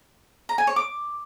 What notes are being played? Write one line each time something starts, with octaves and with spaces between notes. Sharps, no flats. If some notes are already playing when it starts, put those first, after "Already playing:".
A#5
G#5
C#5
D6